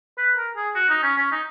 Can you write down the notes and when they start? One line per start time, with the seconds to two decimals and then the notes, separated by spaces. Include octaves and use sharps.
0.18 B4
0.37 A#4
0.56 G#4
0.75 F#4
0.90 D#4
1.03 C#4
1.18 C#4
1.32 D#4